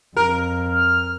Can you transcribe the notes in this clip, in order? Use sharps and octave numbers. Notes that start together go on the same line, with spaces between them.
F2 A#4
F6